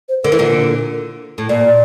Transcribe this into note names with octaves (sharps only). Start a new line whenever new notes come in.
C5
D3 A#4
E3
A#2 D3
A2
A#2 D5